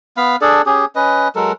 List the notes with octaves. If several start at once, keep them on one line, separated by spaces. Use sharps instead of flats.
B3 F5 B5
D4 G#4 A4 D5
C#4 G4 G#4
C#4 B4 D#5
F#3 G#3 A4 A#4